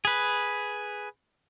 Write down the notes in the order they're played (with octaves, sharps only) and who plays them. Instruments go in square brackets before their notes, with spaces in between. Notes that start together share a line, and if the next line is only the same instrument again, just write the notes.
[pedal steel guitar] G#4 B4